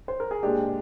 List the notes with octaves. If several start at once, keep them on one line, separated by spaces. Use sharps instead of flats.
C5
A#4
G#4
A#2 G#3 D4 G4